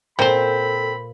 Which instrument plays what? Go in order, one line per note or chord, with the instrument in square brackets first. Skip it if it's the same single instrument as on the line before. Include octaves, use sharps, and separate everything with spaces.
[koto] A#2 C5 [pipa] C4 [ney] A4 [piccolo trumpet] B5